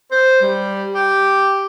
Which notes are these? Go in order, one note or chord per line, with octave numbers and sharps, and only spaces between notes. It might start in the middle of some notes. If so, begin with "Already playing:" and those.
C5
G3
G4